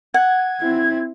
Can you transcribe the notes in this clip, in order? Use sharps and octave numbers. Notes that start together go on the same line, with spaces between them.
F#5 G#6
C4 E4